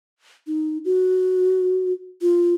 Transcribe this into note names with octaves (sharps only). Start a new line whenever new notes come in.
D#4
F#4
F4